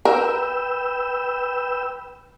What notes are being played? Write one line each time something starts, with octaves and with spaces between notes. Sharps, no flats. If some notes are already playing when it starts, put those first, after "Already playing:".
A#4 B4 G5 E6